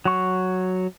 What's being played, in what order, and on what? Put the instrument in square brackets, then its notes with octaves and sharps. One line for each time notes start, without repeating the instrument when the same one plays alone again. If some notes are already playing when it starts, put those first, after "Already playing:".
[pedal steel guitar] F#3 C#6